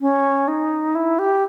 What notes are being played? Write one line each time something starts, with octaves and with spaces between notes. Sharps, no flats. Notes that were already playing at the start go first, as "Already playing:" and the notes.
C#4
D#4
E4
G4